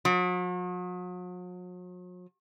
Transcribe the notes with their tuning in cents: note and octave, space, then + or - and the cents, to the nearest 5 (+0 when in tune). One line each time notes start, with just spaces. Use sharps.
F#3 -45